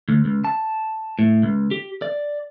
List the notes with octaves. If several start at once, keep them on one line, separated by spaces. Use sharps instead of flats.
D2
C#2
A5
A2
C#2
G4
D5